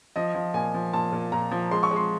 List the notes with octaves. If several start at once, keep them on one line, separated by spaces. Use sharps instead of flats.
F3 D#5
F3
A#2 G#5
F3
A#2 A5
A#2
A#2 A#5
F3
G#3 C6
C#6
G#3
C6